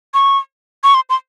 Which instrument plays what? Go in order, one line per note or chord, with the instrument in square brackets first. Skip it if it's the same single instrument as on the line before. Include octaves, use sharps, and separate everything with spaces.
[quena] C#6
C#6
C6
C6